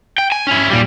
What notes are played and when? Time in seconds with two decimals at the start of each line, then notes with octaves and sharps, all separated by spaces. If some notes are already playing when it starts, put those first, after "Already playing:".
0.18 G5
0.32 G#5
0.47 C#4 E4
0.70 A#2 G3